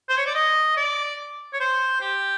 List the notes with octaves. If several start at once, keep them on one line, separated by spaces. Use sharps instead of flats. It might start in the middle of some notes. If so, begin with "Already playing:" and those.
C5
C#5
D5
D#5
D5
C#5
C5
G4